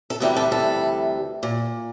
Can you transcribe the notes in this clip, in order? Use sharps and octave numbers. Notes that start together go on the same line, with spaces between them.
A4
D2 C3 E3 G3 A4
A4
A4
A#2